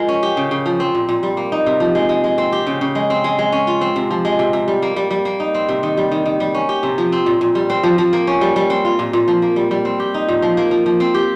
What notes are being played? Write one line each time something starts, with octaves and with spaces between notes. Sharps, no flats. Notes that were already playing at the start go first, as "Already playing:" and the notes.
Already playing: F3 G#3 A#4
C#4
G4
C#3
C#3
F3
C4
A#2
A#2
G3
A#3
D#4
C3
F3
G#3
G#3
G#3
C4
G4
C#3
C#3
G#3
C4
G#3
G#3
C#4
F4
C4
C3
F3
G#3
C3
C3
G3
A#3
G3
G3
A#3
D#4
C4
C3
D#3
G3
D#3
D#3
G3
C#4
G4
C3
F3
C4
A#2
A#2
G3
C4
F3
F3
A#3
C#4
G3
G3
C4
F4
A#2
A#2
F3
A#3
G3
G3
C4
G4
D#4
A#2
F3
A#3
F3
F3
C4
G4